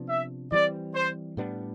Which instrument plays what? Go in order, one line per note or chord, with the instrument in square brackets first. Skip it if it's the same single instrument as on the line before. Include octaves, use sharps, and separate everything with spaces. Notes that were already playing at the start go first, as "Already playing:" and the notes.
Already playing: [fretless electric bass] C3 F3 B3 D4
[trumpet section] E5
[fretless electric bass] E3 G3 C4 [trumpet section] D5
[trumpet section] C5
[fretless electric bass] A2 G3 B3 D4